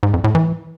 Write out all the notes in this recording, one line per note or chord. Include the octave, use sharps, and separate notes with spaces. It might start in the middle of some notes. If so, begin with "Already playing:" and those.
G#2
F2
A2
E3